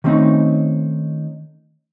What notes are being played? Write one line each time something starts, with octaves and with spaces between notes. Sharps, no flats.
D#3 G3 A3 C4 C#4 D#4